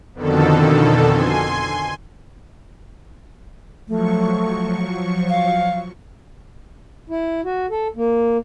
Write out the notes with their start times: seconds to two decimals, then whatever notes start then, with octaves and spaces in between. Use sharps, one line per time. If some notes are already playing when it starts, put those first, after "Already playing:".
0.14 F2 B2 D3 D#3 A4
1.10 G#5 C6
3.88 F3 F#3 A3 C#6
5.29 F5
7.09 E4
7.45 F#4
7.70 A4
7.96 A#3